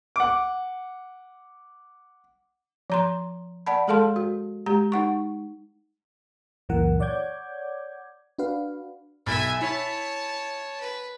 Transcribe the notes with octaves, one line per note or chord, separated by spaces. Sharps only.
F#5 D6
F3 A#5 C6
D5 F#5 A5 B5
G#3 G#4 A4 F5 A5 C6
F#4
G#3 G4 A#5
D#4 F#5 C#6
C#2 F#2 A#2 E3 A#4 F#5
C#5 D5 F#5 D6 G6 G#6
D4 F#4 B4 F5
B1 E5 G#5 B5 A6
E4 C#5 A5 B5 B6
B4